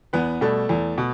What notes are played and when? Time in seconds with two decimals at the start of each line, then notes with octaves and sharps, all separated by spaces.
0.13 E2 B3 B4
0.41 B2 G3 A3 A4
0.69 E2
0.98 B2